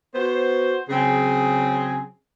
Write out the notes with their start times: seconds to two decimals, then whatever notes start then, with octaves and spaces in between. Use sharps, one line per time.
0.14 B3 F#4 C5
0.90 C#3 F#3 C4 G#4